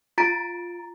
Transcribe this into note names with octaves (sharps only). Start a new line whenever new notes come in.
F4 A#5 A6 D7